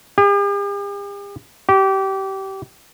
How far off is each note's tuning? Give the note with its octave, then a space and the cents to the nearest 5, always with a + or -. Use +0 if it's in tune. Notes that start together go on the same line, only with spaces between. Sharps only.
G4 +45
G4 -25